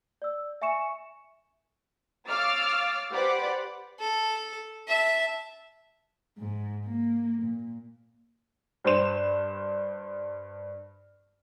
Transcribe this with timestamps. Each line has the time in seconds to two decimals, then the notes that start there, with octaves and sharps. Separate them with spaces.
0.22 D5 E6
0.62 E5 G#5 C#6 C#7 E7
2.28 C#5 F5 D6 E6 F6 A6
3.11 G4 B4 C5 D5 F#5 B5
3.99 A4
4.88 E5 A5
6.38 G#2
6.85 A#3
7.42 A#2
8.84 G2 C5 C6 E7